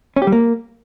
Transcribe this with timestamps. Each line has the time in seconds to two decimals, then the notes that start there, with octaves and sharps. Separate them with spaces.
0.16 C#4
0.22 G4
0.27 G3
0.32 A#3